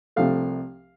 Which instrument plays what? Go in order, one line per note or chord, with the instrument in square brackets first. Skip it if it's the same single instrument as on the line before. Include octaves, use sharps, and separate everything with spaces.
[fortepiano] C2 C3 F3 A3 F5